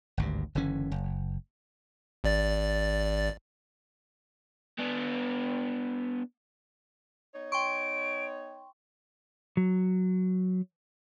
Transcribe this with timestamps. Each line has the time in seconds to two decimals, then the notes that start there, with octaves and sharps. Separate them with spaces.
0.17 G#1 D2 G2
0.55 F#1 D3 E3 C#4
0.92 F#1
2.24 G#1 D5 A6
4.79 B3 D4
7.34 B3 D#4 C#5
7.52 G5 C6 C#6 D7
9.57 F#3